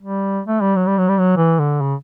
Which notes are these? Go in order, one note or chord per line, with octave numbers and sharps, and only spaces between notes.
G3
A3
G3
F#3
G3
F#3
G3
F#3
E3
D3
C#3